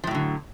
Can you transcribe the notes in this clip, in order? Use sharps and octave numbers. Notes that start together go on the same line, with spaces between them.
A2 D3 F3 F#3